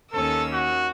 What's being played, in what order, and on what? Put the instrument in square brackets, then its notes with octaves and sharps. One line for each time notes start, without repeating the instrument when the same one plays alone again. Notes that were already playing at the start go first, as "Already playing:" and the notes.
[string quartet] D#2 C#4 E6 [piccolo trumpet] A4
[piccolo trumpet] F#4